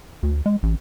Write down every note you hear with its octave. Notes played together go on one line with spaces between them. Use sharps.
D2
G#3
A1